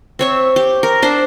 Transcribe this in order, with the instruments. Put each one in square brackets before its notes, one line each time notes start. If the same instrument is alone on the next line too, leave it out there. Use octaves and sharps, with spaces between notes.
[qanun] C4 C#5 E5
G4
A#4
D4 C5